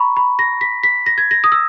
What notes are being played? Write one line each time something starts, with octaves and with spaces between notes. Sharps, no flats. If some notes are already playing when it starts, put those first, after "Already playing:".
Already playing: A#5 B5 C#6
B5
A#6
B6
B6
A#6
G#6
A#6
D#6
E6